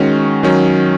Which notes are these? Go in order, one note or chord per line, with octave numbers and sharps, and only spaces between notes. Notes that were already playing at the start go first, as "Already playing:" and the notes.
Already playing: D#3 G#3 C#4 F#4
D#3 F#3 C#4